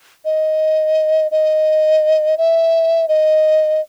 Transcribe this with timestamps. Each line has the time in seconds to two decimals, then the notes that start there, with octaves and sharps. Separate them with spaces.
0.25 D#5
1.31 D#5
2.38 E5
3.08 D#5